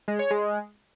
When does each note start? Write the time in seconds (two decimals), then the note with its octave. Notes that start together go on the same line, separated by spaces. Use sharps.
0.08 G#3
0.19 C#5
0.30 G#3